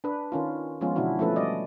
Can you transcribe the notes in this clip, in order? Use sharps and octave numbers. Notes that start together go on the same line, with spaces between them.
D4 B4
D#3 C#4 F4
F3 G#3 B3 C#4 F4
B2 D3 E3 D4 E4 F#4
F3 A3 C#4 A4 B4
G3 D5 D#5